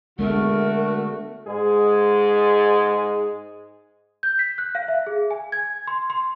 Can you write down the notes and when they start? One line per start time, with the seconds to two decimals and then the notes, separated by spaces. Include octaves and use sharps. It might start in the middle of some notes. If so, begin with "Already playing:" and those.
0.19 D3 G#3 A3 B3 F#4 A#4
1.46 G#2 G#3 G#4
4.23 G6
4.39 B6
4.58 F#6
4.75 F5
4.88 E5
5.07 G#4
5.31 G#5
5.52 G#6
5.87 C6
6.10 C6